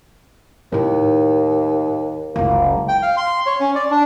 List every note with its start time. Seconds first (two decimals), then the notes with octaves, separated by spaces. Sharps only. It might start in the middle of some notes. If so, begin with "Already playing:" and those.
0.72 D#2 A2 D#4
2.36 F#1 C#2 A#3
2.88 G5
3.02 F5
3.17 C6
3.46 C#5
3.60 C#4
3.75 D5
3.91 D4